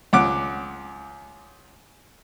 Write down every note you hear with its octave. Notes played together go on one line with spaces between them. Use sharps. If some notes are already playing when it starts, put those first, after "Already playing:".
C#2 F#5 D6